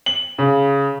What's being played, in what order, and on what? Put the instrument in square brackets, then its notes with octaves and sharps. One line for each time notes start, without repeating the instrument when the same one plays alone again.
[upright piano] F#7
C#3